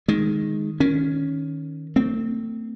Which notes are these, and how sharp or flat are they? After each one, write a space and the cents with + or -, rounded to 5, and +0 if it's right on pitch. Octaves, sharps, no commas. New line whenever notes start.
D#3 +0 G#3 +0
D#3 +0 C#4 +0
A3 +40 C4 -15